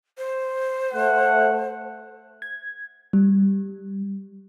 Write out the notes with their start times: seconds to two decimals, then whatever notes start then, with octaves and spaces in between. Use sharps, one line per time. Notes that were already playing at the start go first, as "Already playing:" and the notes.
0.18 C5
0.94 A3 F#5
2.42 G#6
3.13 G3